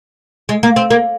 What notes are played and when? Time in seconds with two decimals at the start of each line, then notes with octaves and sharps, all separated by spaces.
0.49 G#3
0.63 A#3
0.76 C4
0.91 A#3